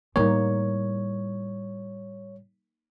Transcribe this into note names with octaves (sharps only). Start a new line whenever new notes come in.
A2 G3 A#3 D#4 C#5